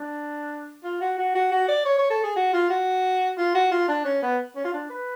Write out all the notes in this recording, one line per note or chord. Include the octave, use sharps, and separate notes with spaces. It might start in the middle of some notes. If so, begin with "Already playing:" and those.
Already playing: D4
F4
F#4
F#4
F#4
F#4
D5
C#5
C#5
A4
G#4
F#4
F4
F#4
F4
F#4
F4
D4
C#4
B3
C#4
F4
D4
B4